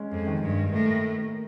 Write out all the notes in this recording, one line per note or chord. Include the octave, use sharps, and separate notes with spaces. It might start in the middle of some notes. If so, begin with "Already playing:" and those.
Already playing: G#3 C#4
F2
D#3
G2
A2 A#3
A#3